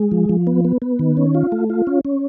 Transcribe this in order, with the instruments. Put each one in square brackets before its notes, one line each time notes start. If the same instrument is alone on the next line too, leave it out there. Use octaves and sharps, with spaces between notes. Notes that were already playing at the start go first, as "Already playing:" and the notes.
Already playing: [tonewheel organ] G#3
F3
F3
B3
B3
B3
D#3
C#4
F4
A3
F4
C#4
C#4